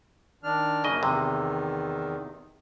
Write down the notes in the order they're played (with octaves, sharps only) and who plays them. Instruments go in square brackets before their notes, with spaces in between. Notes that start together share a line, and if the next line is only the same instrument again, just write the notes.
[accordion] D#3 D4 F6
[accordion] F#2 A#3 [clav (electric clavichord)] C#3 D#5
[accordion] E2 D#3 [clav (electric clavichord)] C3